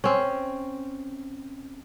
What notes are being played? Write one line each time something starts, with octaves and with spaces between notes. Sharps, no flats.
C4 C#4